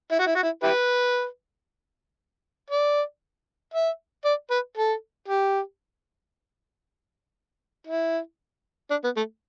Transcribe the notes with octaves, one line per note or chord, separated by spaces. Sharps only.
E4
F#4
E4
F#4
E4
E4 G4 B4
D5
E5
D5
B4
A4
G4
E4
D4
B3
A3